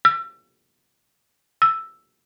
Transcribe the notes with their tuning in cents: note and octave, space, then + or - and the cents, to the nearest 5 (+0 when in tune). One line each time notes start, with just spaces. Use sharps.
E6 +35
E6 +5